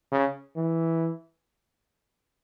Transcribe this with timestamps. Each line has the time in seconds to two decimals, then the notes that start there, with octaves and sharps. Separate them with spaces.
0.12 C#3
0.57 E3